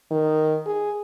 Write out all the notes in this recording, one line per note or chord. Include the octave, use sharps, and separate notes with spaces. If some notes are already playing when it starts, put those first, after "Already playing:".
D#3
G#4